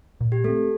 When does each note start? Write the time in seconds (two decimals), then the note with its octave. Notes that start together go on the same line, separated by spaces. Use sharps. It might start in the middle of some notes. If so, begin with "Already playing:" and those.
0.21 A#2
0.32 G4
0.44 A3 C4 A4